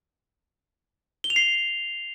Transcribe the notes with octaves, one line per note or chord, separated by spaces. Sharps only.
G7
F7
C7